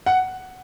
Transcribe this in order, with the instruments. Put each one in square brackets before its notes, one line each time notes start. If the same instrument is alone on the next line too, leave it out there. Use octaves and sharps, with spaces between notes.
[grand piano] F#5